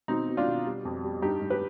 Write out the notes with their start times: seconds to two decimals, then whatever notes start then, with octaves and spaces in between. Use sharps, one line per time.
0.08 B2 C4 D#4
0.28 B2
0.37 D4 F4
0.47 B2
0.66 G3
0.85 F2
1.04 G3
1.22 G2 D#4 G4
1.42 G2
1.50 G4 B4